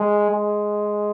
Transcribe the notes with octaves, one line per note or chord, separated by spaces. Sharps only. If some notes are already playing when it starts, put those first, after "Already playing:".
Already playing: G#3
G#3